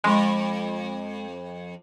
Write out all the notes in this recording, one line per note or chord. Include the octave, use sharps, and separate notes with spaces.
F2 G#3